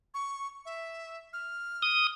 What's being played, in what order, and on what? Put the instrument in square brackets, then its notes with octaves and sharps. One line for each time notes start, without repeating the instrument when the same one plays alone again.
[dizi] C#6
E5
F6
[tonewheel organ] D#6